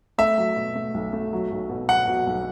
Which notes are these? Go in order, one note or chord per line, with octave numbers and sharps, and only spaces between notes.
A3 E5
F#3
B2
A3
B1
A3
F#3
B1
B2
F#3 F#5
B2
B1